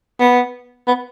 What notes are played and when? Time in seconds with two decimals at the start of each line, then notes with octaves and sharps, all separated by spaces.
0.20 B3
0.87 B3